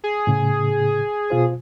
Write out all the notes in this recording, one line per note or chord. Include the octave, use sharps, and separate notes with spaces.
G#4
A2 C#3
B2 F4 C5